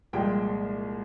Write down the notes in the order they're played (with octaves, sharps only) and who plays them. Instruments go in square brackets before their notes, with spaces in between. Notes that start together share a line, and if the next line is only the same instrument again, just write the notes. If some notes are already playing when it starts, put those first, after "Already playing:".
[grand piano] C2 A#2 F3 G#3 G5